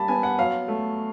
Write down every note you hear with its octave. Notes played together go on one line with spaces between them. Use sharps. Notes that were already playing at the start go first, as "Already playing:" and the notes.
Already playing: G3 A#3 A5 B5
B3 G#5
F#5
F#3 F5
A3